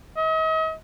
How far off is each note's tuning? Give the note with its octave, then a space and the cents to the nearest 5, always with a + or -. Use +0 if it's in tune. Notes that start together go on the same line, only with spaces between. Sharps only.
D#5 +40